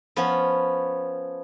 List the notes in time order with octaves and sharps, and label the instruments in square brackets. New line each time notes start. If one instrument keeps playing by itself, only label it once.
[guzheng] F3 B3 C#4